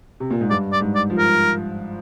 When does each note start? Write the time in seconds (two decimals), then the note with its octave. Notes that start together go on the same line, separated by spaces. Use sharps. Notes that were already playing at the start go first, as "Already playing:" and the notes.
0.20 C3
0.30 A#2
0.41 G#2
0.50 G2 D5
0.73 D5
0.80 G#2
0.95 D5
1.10 F3
1.18 A#4